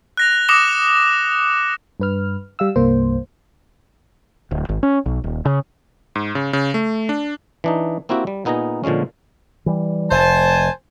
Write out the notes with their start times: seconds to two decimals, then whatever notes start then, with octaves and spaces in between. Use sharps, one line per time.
0.17 F#6 A#6 F7
0.49 D6 D#6 A#6 C#7 E7 G7
2.00 G2 B4 F6
2.59 G3 F5 E6
2.76 C2 G2 A#3 C5
4.51 D1
4.69 G#1
4.83 C#4
5.06 B1
5.24 D#1
5.45 C#3
6.15 G#2
6.35 C#3
6.53 C#3
6.74 A3
7.09 D4
7.64 E3 D4 D#4
8.09 A#3 C4 E4 F#4 G4
8.27 G3
8.45 A#2 B3 D#4 G#4 G#5 A#5
8.84 A#2 D3 F3 G#3 C#4
9.66 E3 G3
10.11 F1 C5 G#5 A5